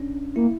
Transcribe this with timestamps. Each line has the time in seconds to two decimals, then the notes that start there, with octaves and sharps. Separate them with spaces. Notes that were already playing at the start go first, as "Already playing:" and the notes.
Already playing: C#4 D4
0.36 A#3 E4